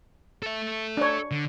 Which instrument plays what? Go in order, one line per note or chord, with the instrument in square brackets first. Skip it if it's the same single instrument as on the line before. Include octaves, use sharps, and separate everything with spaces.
[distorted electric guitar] A4 E5
[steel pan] D4 C#5
[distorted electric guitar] D3